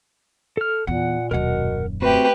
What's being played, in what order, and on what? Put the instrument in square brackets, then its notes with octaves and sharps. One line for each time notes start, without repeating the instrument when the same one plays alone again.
[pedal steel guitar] A4 F6
[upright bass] E2 [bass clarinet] A#2 [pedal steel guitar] F#5
[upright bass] D#1 F#2 [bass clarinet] B2 [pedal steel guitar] A#4 F#5
[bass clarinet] A3 [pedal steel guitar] C4 F#4 [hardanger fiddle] G4 B4